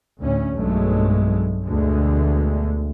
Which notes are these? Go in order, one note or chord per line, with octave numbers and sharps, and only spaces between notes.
D2 A2 C#4
B1 G2 F#3 G#3 A3
D2 B2 D3 G#3